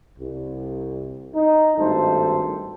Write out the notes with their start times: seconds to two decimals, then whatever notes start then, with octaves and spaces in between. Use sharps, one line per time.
0.19 C2
1.34 D#4
1.77 G#1 G2 A3 A4 C5